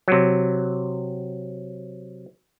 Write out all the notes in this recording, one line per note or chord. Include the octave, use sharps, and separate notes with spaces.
C3 F#3